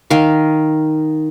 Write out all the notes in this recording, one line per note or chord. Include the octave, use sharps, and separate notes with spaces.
D#3 F5